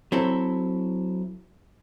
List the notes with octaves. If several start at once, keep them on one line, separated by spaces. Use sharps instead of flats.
F#3 C4 E4 A4